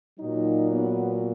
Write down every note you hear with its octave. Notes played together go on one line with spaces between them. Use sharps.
A#2 F#3 D#4
B3